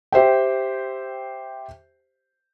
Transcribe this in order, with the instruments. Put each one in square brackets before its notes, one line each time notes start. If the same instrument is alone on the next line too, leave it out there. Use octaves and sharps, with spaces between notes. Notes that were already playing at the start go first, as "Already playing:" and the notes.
[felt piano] G4 C5 E5 G5